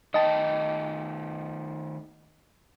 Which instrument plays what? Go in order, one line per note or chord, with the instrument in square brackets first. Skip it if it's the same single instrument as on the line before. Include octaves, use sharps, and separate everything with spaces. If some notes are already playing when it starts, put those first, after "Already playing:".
[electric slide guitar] D#3 A3 G5 [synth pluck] D#5 A5